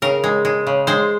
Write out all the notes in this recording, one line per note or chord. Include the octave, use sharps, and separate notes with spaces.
C#3 A#4
G#3
G#3
C#3
G#3 C5